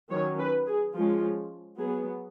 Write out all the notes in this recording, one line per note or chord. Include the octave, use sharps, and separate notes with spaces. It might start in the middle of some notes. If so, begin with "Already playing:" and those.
D#3 F#3 C#4 C#5
B4
G#4
F3 G#3 C#4 F4
F#3 B3 G#4